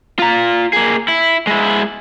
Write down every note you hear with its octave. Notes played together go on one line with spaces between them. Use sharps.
F4 A#5
A#3 G#4
E4
G#3 E4